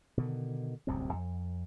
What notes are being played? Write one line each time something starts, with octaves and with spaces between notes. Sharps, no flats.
B2 D3 D#3
D1 C2 F#2 C4
F2